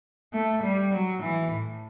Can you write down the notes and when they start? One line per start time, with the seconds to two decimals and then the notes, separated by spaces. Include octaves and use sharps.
0.33 A3
0.63 G3
0.93 F#3
1.22 E3
1.53 A2